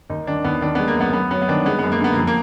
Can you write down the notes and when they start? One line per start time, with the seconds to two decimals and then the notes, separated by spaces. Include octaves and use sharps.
0.10 D#2 D#4
0.27 D#3 D4
0.44 D#2 B3
0.62 D#3 D4
0.75 G#3 B3
0.88 A#3
0.96 F#2 B3
1.13 F#2 B3
1.31 F#3 B3
1.42 B3
1.48 D#3 D4
1.66 G#3 B3
1.79 F#2 B3
1.92 A#3
2.00 D3 B3
2.13 A#3
2.17 F2
2.27 A#3